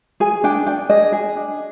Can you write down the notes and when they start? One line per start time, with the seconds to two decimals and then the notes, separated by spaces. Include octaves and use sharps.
0.20 G#4 G#5
0.44 D4 G5
0.66 D4 G5
0.90 G#4 D#5
1.12 G#4
1.36 D4